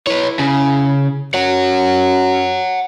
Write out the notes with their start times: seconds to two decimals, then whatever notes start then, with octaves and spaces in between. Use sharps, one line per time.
0.07 E4 B4 C#5
0.39 C#3
1.34 F#2 C#5 F#5